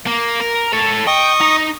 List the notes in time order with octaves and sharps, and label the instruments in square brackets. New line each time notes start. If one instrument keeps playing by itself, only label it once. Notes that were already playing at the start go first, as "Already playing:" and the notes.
[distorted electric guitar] A#3
A#4
A4 C#5
[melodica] D#5 C#6 D#6 [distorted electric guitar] G5
[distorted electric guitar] D#4